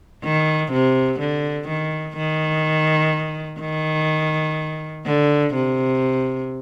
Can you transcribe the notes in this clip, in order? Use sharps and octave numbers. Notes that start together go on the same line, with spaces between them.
D#3
C3
D3
D#3
D#3
D#3
D3
C3